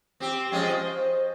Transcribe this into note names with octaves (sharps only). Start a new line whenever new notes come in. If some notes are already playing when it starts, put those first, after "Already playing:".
C4 G4
F3 G#3 C#4 G5
C5 D#5